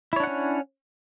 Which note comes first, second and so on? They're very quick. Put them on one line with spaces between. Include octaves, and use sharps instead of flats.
E4 C#5 D4 F#5 C#4